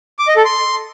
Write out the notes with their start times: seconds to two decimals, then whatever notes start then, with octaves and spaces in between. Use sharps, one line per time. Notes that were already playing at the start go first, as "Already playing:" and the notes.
0.19 D6
0.28 D#5
0.36 A4
0.45 C6